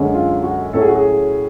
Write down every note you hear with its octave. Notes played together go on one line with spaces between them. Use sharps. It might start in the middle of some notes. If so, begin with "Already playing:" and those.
Already playing: F#2 D3 G#3 C#4
F4
F#4
A2 F#3 A3 C#4 A4
G#4
F#4
G#4